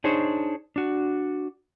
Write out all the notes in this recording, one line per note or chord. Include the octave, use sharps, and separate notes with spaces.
D4 D#4 G#4 C5 C#5
D4 F#4